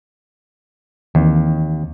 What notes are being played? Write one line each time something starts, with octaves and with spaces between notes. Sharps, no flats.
D#2 D#3 E3 C4